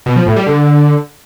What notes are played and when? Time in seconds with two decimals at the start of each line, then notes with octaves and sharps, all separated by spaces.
0.06 B2
0.16 F3
0.26 A2
0.36 G3
0.46 D3